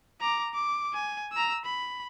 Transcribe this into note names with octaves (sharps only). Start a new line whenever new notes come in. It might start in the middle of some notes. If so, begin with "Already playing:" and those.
A#5 D6
D6
G#5
A#5 E6
B5